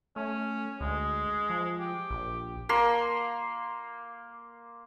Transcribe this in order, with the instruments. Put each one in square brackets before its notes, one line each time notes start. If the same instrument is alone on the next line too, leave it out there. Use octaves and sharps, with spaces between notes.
[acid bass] A3 [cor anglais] C#4
[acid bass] D2 [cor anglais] G#3
[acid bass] F3
[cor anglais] G4
[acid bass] A#1
[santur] A#3 C6